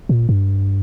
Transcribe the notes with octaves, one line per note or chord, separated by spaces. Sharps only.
A#2
G2